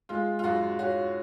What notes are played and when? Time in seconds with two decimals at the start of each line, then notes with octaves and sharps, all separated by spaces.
0.09 G#3 F4
0.39 F4
0.44 F#2 F#4
0.79 C#4 F#4